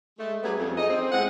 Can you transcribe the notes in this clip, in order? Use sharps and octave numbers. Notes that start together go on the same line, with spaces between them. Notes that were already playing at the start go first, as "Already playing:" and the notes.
G#3 A3
F#3 G3 B3 C#4 G#4 B4
F2
E2 D#4 G#4 D#5
C4
A2 G#3 A3 F#5